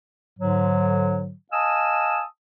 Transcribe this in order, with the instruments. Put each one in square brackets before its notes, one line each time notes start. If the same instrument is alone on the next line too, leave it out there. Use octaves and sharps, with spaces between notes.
[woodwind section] G#2 D3 F#3
D#5 F5 G#5 A5 D#6 E6